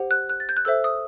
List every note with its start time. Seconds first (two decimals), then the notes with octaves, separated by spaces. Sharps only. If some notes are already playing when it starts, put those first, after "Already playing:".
Already playing: G4 C5 F#5
0.11 F#6
0.29 F#6
0.40 A6
0.49 G6
0.57 F#6
0.65 A4 C5 E5 E6
0.84 D#6